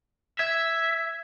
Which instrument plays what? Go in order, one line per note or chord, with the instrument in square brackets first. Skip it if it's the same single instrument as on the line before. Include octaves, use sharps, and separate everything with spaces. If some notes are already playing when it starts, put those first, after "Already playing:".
[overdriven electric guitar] E5 [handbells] G#6